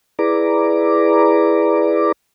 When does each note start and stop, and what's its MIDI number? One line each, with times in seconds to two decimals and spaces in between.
0.19 2.12 64
0.19 2.12 68
0.19 2.12 71
0.19 2.12 74
0.19 2.12 82
0.19 2.12 86